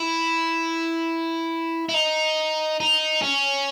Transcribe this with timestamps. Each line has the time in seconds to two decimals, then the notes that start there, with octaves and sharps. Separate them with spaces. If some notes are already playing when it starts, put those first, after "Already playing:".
Already playing: E4
1.89 E4
1.94 D#4
2.80 D#4
3.22 C#4